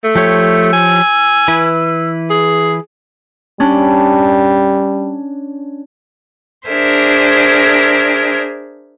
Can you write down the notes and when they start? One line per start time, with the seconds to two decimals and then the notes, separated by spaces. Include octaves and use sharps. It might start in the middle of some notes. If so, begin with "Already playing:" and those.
0.04 A3 E6
0.15 F3 G4 C#5
0.73 G#5
1.48 E3 E4 B4
2.30 G#4
3.60 G3 C#4 D4
6.67 D4 G#4 A#4 C5 E5